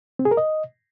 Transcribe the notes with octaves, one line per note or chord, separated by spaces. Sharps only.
C4
G#4
A#4
D#5